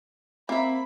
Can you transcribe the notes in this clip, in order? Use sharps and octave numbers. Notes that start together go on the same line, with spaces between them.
A#3 C4 E5 B5